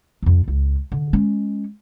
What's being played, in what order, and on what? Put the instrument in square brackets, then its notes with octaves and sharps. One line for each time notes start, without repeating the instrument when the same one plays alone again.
[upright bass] F2 D4
C#2
D3
G#3 C#4